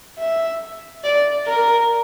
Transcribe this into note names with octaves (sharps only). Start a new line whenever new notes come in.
E5
D5
A#4